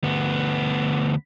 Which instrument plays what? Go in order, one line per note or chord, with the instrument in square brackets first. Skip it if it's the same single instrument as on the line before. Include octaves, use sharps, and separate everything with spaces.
[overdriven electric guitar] D2 B3